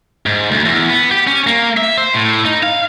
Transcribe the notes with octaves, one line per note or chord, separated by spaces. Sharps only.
G#2
D2
E2
B3
G4
C#4
A#3
E5
C5
A2
D#4
F5